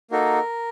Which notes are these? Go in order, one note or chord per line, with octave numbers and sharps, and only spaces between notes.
A#3 D#4 F#4 A4 A#4